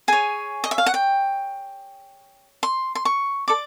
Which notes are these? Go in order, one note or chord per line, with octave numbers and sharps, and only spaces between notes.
G#4 C#5 G#5
D#5
E5
F5
F#5
G5
C6
C6
C#6
A4 D5 D6